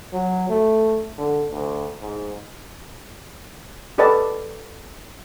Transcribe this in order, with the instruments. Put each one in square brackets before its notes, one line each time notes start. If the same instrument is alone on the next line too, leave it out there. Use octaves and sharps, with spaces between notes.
[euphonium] F#3
A3
D3
D2
G#2
[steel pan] G4 A4 B4 D5 D#5 A5